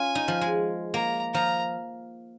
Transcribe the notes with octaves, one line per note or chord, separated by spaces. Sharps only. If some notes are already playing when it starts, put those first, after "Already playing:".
Already playing: C#4 F4 G#5
D#4
F3
G#3
A#3 A#5
F3 A#5